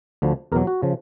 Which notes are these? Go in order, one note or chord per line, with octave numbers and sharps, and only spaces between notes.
D2 D3 F3
E2 B2 F#3 A#4
F#4
C#3 F3